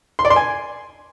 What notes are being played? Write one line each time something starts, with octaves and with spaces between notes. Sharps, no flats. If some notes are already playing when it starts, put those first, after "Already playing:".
C6
D5
C6
G#5